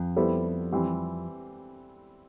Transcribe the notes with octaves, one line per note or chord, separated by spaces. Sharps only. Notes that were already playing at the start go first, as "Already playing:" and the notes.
Already playing: F2
G3 B3 E4 A4 C5
E3 G3 C4